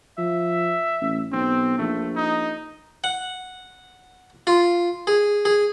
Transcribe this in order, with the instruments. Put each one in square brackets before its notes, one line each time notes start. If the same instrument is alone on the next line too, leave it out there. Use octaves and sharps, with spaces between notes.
[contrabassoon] F3 [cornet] E5
[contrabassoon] A1
[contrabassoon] B1 [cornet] C4
[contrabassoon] A#1 [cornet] A3
[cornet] D#4
[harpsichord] F#5
F4
G#4
G#4